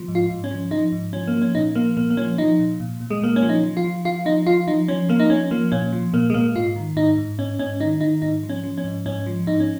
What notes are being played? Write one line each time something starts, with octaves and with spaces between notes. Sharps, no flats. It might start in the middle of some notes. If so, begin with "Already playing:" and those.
Already playing: F3
G#2
F4
G#2
C#4
F3
F3 D#4
G#2
F3 C#4
A#3
F3
C#4
A#2 D#4
F3 A#3
A#2 A#3
A#3
F3 C#4
F3 D#4
A#2
A#2
A#2
G#3
A#2 A#3
C#4
F3
D#4
F3
F4
F3
F3 F4
F3 D#4
F3 F4
F3 D#4
F3 C#4
F3 A#3
D#4
F3 C#4
F3 A#3
A#2 C#4
F3
A#2 A#3
G#3
A#2 A#3
G#2 F4
D#3
G#2 D#4
G#2
G#2 C#4
G#2 C#4
D#3 D#4
D#3 D#4
G#2 D#4
F3
C#4
F3
C#4
G#2
G#2 C#4
F3
G#2 D#4
C#4